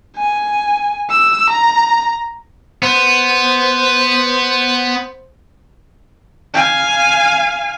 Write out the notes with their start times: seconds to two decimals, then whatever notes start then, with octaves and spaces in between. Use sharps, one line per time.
0.17 G#5
1.10 E6
1.49 A#5
2.83 B3 C5
6.54 F5 G#5